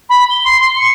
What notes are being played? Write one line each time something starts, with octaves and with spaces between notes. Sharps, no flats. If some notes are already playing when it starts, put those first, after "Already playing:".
B5
G7
C6
C6
C#7